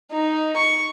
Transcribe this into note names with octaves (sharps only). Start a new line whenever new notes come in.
D#4
C#6